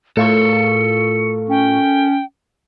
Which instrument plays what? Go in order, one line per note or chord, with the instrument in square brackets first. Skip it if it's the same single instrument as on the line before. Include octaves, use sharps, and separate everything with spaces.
[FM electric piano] A2 F4 C#6 [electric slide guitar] A4 A#4 [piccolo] C#7
[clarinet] C#4 [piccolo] G5